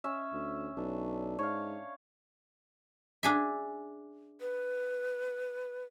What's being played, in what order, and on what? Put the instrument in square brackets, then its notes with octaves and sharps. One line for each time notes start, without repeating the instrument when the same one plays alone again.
[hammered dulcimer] C#4 E5
[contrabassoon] D2
[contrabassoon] B1 [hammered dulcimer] D4
[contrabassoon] G#2 [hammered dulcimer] C#5 F5
[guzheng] D4 G#4 E5
[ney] B4